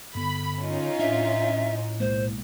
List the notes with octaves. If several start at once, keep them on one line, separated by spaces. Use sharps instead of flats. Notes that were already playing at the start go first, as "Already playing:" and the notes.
G2 D3 B3 B5
C#4 D#4 F4
A2 D4 E5
B1 G#3 A#3 C5